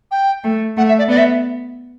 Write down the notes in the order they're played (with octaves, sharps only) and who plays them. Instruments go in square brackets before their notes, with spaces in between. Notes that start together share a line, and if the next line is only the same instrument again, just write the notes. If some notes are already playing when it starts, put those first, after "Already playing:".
[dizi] G5
[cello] A3
[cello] A3 [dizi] F#5
[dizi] E5
D5
[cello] B3 [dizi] D5
[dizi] E5